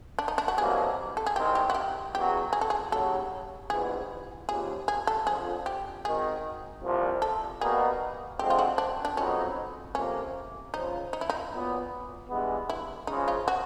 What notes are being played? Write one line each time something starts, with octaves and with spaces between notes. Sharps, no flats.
D4
D#4
D4
F#4
C2 B2 F#3 A#3 G#4
A4
G#4
C2 C3 D#3 G#3 C4 G4
G4
F#4
G4
E2 C#3 F#3 G4
G#4
A4
G#4
D#2 C#3 F#3 A4
A#1 G#2 E3 G3 B3 G#4
D#2 C#3 F3 G#4
G#4
A4
F2 D3 F3 G#4
G4
G#1 G#2 D#3 G#4
C2 A#2 F3
A4
B2 G3 A#3 D#4 F#4 G#4
D3 F3 G#3 C4 G4
F4
F#4
D4
D4
F2 C#3 F#3 B3 C#4 D#4
F2 C3 F3 A#3 C#4
C#2 C#3 F3 D#4
D#4
E4
D#4
A#2 F#3 B3
G2 E3 G#3 B3
E4
C#3 F3 G#3 D#4
F4
F#4